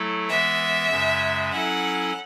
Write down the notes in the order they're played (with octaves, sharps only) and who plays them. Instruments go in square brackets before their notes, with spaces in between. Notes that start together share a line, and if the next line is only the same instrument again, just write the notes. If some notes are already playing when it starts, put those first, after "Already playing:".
Already playing: [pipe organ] F#3 A3 E4 A4
[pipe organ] E3 G#3 B3 [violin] E5
[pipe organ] F#2 C#3 G#3
[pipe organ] F#3 C#4 E4 A4 [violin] F#5